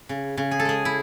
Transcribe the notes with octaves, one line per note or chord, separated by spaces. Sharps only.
C#3
C#3
G#4
A4
G#3 G#4
E4